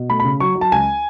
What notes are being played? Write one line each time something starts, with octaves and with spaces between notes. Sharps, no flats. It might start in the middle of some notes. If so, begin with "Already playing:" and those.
Already playing: B2
A3 B5
C#3 B5
F#3 C#6
F#3
A5
C#2 G#5